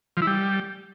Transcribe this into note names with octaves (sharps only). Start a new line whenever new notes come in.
F3
E4
G3